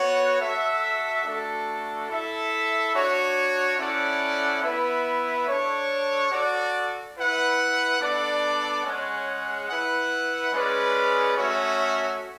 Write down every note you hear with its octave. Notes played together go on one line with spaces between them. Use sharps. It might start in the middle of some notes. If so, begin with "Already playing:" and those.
Already playing: B3 F#4 C#5 F#5
F#4 A4 E5
A3 D4 F#4 A4
E4 A4 E5
D4 F#4 C#5
C#4 E4 A4 D5 F#5
B3 E4 B4 E5
D4 A4 C#5
F#4 A4 D5
E4 B4 F#5
B3 D4 A4 D5
G#3 C#4 G#4 C#5 F#5
E4 B4 F#5
G#3 C#4 G#4 B4 D5
A3 C#4 F#4 C#5 E5